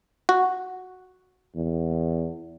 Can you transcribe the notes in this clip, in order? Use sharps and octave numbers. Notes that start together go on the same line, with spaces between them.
F#4
E2